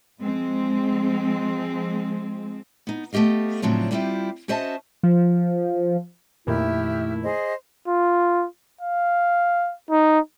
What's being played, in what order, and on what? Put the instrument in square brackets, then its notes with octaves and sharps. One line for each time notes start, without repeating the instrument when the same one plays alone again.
[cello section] F3 G#3 C4
[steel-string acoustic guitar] B3 D#4
A3 B3 G4 D#5 F5
A2 C#3 F3 F#3 C4 D4
G3 B3 C4 E4 F4 G4
C#4 F#4 C5 D#5 E5 A5
[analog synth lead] F3
[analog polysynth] F2 A#2 D#3 [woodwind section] A3 E4 [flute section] G4 E5 F6
[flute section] G#4 C5 D#5
[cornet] F4
F5
D#4